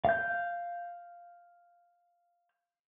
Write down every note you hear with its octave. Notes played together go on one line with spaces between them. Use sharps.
F5 G6